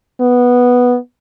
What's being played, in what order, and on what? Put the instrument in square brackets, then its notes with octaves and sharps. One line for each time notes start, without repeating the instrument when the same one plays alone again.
[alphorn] B3